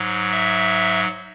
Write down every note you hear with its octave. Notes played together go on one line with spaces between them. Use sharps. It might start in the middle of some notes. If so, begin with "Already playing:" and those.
Already playing: G#2 F#3
E5